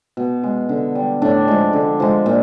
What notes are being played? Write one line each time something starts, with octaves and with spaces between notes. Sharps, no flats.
B2
G#3
D3
G3
A2 D4
F3 G#3
D3
F3 G#3
A#2